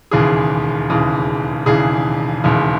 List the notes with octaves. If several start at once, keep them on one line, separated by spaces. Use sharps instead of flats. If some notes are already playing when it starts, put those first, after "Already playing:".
E1 D#2 C#3 E3 G#4
E1 D#2 C#3 E3
E1 D#2 C#3 E3 G#4
E1 D#2 C#3 E3